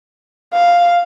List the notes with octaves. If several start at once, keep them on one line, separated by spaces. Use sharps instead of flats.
F5